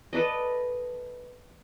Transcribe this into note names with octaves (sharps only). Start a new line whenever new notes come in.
A4 B4 D5 D#5